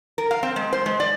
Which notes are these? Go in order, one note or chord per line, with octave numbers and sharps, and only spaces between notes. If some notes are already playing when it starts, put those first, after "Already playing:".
A#4
F5
C4
G#3
C5
G#3
D5